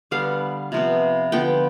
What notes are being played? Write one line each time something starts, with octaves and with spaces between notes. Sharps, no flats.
D3 G3 B3 F5
C3 F3 B3
D3 F3 B3 G5